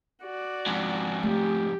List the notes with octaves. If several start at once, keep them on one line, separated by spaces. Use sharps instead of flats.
F#4 D5
F2 G#2
A3 G4